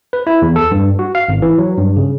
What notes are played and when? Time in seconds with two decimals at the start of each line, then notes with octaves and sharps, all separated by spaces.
0.13 B4
0.27 E4
0.42 E2
0.56 A4
0.72 G2
0.99 F#4
1.15 F5
1.28 G#1
1.42 E3
1.58 F#3
1.77 G2
1.97 C#3